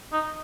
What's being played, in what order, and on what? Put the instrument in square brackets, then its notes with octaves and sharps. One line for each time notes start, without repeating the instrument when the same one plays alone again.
[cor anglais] D#4